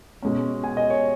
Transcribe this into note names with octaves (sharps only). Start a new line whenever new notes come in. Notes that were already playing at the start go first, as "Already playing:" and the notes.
B2 G#3 C#4
G#5
D#5
C#5